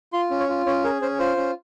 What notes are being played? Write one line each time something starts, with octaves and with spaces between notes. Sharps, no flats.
F4 C6
C#4
C#5
F4
C#4 C#5
G#4 A#4
C#4 C5
F4 C5
C#4